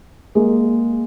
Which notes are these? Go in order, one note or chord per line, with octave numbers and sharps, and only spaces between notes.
G#3 A#3